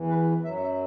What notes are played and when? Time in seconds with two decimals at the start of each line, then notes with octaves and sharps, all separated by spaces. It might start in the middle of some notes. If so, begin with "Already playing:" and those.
Already playing: E2 E3
0.09 B4
0.44 F#2 F#3 E5
0.62 E5